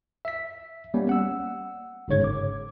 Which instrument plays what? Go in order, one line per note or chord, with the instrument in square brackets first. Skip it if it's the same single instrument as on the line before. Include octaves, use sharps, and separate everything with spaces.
[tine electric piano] E5 B6
G3 A#3 B3 C#4
F#5 E6
G1 G#2 C#3 C#5 G#6
D6